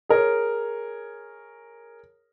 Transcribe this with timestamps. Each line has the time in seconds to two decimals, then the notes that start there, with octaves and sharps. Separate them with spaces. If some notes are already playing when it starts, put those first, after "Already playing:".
0.09 G#4 A#4 C#5